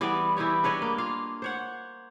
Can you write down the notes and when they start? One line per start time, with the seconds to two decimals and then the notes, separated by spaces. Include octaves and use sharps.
0.01 E3 G3 B3 D5
0.37 E3 E4 G4 C#5
0.64 D4 B4 C#5 D#5
0.82 A#3
0.98 F4 F5
1.42 C5 C#5 F#5